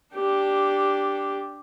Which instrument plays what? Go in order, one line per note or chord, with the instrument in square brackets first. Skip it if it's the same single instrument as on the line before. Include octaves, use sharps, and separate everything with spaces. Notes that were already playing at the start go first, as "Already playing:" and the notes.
[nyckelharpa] D4 G4